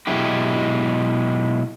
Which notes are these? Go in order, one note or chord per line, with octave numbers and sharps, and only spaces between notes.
B2 F#3 G#3 E4 G4